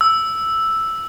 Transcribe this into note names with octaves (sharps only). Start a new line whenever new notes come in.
E6